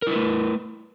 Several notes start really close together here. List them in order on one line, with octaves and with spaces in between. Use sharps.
A#4 E4 B4 A3